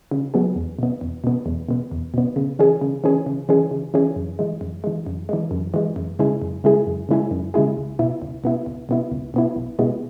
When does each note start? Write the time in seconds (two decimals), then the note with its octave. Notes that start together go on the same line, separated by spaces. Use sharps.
0.11 C#3
0.34 F#3 B3 G#4
0.56 E2
0.79 B2 B3
1.01 E2
1.24 B2 B3
1.46 E2
1.69 B2 B3
1.91 E2
2.14 B2 B3
2.36 C#3
2.59 E3 C#4 G#4
2.81 C#3
3.04 E3 C#4 G#4
3.26 C#3
3.49 E3 C#4 G#4
3.71 C#3
3.94 E3 C#4 G#4
4.16 F#2
4.39 E3 G#3
4.61 F#2
4.84 E3 G#3
5.07 F#2
5.29 E3 G#3
5.51 F#2
5.74 E3 G#3
5.96 F#2
6.19 C#3 G#3 E4 G#4
6.42 F#2
6.64 C#3 G#3 E4 G#4
6.87 F#2
7.09 C#3 G#3 E4 G#4
7.31 F#2
7.54 C#3 G#3 E4 G#4
7.77 C#2
7.99 B2 B3 E4
8.22 C#2
8.44 B2 B3 E4
8.66 C#2
8.89 B2 B3 E4
9.12 C#2
9.34 B2 B3 E4
9.56 B1
9.79 B2 G#3 B3 E4